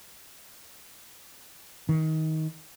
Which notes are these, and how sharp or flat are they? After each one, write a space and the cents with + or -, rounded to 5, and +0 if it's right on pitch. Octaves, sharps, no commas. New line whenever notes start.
D#3 +20